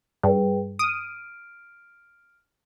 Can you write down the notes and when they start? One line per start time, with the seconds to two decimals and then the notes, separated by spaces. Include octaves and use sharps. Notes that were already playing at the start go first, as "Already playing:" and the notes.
0.23 G2 G#4 B4 G5
0.79 D#6 F6 D7